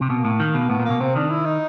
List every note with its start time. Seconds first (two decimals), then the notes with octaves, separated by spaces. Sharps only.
0.01 C3
0.10 B2 A#3
0.25 A2
0.40 D#3
0.54 B2
0.69 A2 B3
0.80 A#2
0.85 A#3
0.90 B2
1.00 C3 C4
1.15 D#3 D4
1.30 E4
1.45 D#4